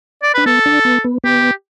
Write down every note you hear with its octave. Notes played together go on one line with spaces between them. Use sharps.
D5
D4 B4
B3 A4
D4
B3
B3
B3 G4